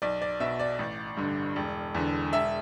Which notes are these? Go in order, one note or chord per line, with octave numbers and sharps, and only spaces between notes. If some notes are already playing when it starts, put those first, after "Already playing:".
B1 D5
D5
B2 E5
D5
A1
G2 D3
E1
E2 D3
E1 E5